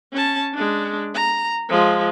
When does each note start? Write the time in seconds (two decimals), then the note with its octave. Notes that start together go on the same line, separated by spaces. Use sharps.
0.13 C#4 A5
0.54 G#3 D4
1.15 A#5
1.69 F3 G#3